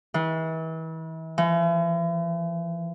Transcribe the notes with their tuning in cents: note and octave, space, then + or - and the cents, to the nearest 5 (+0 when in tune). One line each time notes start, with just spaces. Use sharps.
E3 -35
E3 +45